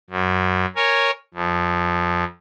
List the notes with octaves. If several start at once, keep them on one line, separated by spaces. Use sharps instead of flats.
F#2
A#4 C#5 G#5
F2